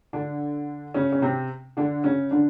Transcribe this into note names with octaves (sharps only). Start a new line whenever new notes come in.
D3 D4
C#3 C#4
C#4
C3 C4
D3 D4
C#3 C#4
D3 D4